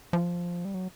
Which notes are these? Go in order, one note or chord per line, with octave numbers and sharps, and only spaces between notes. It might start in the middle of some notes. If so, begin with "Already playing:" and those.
F3
G3
F#3